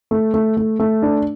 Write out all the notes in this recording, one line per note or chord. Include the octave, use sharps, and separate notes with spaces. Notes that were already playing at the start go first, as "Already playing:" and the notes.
A3
A3
A3
A3
D4